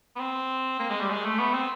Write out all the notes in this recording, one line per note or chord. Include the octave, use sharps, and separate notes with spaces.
B3
C4
A#3
G#3
G3
G#3
A3
B3
C4